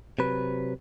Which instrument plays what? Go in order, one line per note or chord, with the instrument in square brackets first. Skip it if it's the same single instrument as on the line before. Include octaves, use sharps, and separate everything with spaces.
[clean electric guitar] C3 F#3 B4